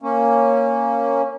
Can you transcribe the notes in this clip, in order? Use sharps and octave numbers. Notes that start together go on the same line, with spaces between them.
A#3 C#4